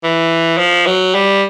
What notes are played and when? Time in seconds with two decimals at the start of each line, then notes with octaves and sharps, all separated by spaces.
0.03 E3
0.58 F3
0.86 F#3
1.14 G3